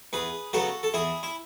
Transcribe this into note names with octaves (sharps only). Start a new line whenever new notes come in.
E2 G#4 B4
C#3 F#3 B3 F#4 A4
A4
E2 E4 G#4
E4